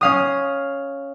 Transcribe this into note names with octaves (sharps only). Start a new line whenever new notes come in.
C#4 F5 D#6